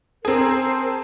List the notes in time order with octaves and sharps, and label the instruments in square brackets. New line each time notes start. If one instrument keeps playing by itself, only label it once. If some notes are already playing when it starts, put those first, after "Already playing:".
[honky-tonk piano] C4 G#4 [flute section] A#4 C5 A5